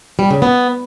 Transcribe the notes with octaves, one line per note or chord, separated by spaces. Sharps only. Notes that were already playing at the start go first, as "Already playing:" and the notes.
G3
C#3
B3